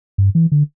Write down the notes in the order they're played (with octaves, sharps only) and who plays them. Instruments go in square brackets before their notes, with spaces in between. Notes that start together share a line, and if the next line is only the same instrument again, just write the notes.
[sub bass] G2
E3
D3